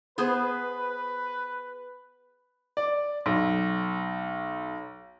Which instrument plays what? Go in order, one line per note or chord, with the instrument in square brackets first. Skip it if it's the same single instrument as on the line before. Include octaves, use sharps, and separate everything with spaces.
[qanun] B3 G#4 C5 [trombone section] B4
[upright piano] D5
B1